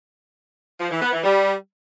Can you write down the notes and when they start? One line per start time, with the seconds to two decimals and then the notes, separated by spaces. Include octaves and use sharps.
0.80 F3
0.91 E3
1.02 B3
1.13 E3
1.24 G3